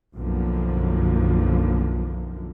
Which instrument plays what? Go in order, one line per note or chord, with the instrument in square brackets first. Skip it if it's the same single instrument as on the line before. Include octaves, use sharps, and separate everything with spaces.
[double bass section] B1 F#2 D3 F3 A#3